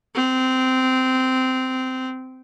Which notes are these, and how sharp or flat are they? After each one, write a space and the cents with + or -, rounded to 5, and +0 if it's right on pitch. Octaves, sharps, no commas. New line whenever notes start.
C4 -15